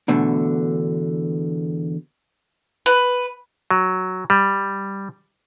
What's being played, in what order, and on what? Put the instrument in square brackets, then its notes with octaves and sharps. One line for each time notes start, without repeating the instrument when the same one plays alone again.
[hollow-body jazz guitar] E2 B2 D3 A3
[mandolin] B4
[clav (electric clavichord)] F#3
G3